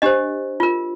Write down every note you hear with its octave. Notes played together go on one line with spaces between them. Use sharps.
D4 G4 C5 D#5
F4 A#4